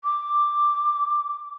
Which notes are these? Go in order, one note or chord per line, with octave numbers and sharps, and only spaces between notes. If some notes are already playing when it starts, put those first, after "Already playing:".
D6